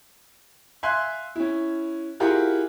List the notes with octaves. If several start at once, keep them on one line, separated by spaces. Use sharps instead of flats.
E5 F5 G#5 C6 F#6 G#6
C#4 E4
E4 F4 G4 G#4 A#4 F#5